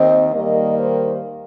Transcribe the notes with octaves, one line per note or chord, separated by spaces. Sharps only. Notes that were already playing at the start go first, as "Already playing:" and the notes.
Already playing: D#2 D#3 C4 D#5
D#2 D#3 G3 A#3 D#5
C5